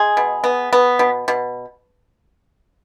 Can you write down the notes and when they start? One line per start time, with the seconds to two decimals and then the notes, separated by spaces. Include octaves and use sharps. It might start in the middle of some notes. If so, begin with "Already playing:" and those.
Already playing: G#3 G#4
0.17 B2
0.44 B3
0.73 B3
0.99 B2
1.28 B2